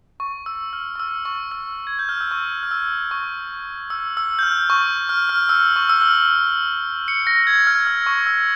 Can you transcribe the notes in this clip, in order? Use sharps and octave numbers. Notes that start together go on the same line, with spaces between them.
C#6
E6
F6
C#6
E6
C#6
E6
G#6
G6
F6
E6
C#6
F6
E6
C#6
E6
E6
G6
F6
C#6
F6
F6
E6
C#6
E6
F6
C#7
A#6
G#6
F6
E6
C#6
E6